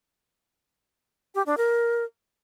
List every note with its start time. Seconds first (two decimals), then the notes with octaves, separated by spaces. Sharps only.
1.35 G4
1.46 D4
1.57 A#4